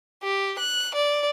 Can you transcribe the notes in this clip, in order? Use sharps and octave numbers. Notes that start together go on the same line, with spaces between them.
G4
F#6
D5